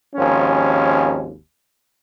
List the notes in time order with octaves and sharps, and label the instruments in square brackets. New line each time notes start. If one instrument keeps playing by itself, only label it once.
[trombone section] G#1 D#2 F3 C#4